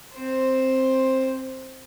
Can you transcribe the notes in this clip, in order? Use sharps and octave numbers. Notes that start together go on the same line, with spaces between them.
C4 C5